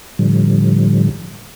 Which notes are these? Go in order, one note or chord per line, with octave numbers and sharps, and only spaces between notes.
A2 D3 F3 G3